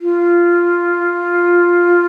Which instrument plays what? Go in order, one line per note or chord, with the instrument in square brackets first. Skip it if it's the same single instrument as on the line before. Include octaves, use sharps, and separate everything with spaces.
[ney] F4